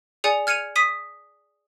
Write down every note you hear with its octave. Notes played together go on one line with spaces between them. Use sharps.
G#4 D5 G#5 C#7
F6 G#6 C#7 D#7 F7
D#6 B6 D#7